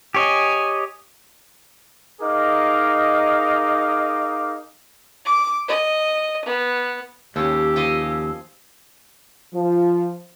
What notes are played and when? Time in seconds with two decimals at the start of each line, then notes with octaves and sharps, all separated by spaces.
0.14 G4 C#5 D#5 G#5
2.21 D#4 G#4 A#4 D#5 F5 D6
5.25 D6
5.68 D#5
6.45 B3
7.36 D#2 F3 C#4 G4 E6
7.76 F3 D#5 G#5
9.53 F3